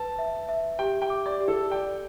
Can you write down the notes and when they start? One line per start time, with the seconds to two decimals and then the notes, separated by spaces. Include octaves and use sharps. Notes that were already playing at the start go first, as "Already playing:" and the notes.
Already playing: B4 A5
0.19 E5
0.49 E5
0.79 G4 G5
1.02 G5
1.10 D6
1.26 D5
1.40 G4
1.48 A4
1.71 D5 G5